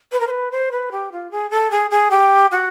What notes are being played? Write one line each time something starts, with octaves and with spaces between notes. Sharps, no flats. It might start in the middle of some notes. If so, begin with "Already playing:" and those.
B4
A#4
C5
B4
C5
B4
G4
F4
G#4
A4
G#4
G#4
G4
F#4